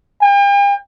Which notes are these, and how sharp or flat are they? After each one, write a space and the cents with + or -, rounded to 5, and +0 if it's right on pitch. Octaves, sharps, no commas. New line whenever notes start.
G5 +45